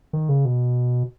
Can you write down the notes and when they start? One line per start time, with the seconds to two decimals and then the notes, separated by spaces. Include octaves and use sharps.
0.13 D#3
0.29 C#3
0.45 B2